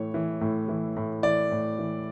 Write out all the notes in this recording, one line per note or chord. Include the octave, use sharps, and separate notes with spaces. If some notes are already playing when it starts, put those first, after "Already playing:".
Already playing: A2 E3 C#5
E3
A2
E3
A2
E3 D5
A2
E3